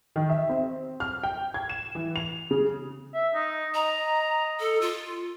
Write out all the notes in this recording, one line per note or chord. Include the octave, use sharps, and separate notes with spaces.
D#3
E5
C4
F6
G5
G#6
E7
E3
F7
C#3
E5
D#4
D#5 A#5
A4
F4